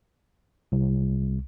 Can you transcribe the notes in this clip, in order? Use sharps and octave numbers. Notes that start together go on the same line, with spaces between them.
C2